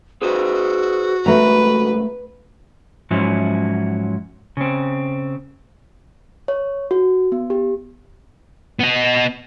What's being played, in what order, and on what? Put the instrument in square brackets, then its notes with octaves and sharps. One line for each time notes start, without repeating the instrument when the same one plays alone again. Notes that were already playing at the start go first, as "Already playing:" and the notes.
[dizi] F#4 [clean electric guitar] G#4 B4 C5
[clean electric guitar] C2 G#2 [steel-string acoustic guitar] A3 A#5 [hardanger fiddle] B4
[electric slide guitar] G#2 F3 F#3 C#4 E4
C#3 C4
[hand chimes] C#5
F#4
B3
G4
[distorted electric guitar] B3 D#5